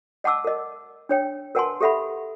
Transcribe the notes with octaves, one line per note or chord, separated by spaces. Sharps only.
D#5 F#5 A5 D6 E6
A#4 D#5
D4 C#5 G5
A#4 B4 F#5 G#5 A5 C6
G4 A4 E5 F#5 B5